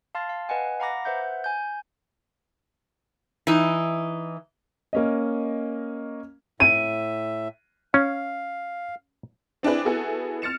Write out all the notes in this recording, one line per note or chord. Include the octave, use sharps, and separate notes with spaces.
F5 A5 C6 F6 A6
F5
B4 D#5 F#5 G#5
F5 F#5 A#5 B5 D6 A#6
B4 C5 E5 F#5 G6
G#5 G6
E3 D#4
A#3 C#4 D#5
A2 E5 D#7
C#4 F5
C4 D4 E4 G#4 B4
B3 E4 F#4 G#4 A4
F6 A6 C#7 E7